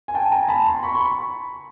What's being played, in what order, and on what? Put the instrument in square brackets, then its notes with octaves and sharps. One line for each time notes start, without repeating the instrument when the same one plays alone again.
[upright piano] G#5
G5 A5
G#5 A#5
A5 B5
A#5 C6
B5 C#6
B5 C#6